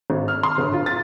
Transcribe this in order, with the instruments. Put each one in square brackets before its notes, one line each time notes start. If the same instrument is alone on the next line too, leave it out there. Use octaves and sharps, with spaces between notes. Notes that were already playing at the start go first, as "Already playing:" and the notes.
[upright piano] G#1
F6
C6
G1
F4
A6